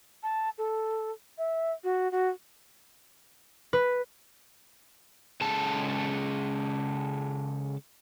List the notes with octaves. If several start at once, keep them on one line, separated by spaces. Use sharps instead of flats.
A5
A4
E5
F#4
F#4
B4
C#3 G#3 A4 A5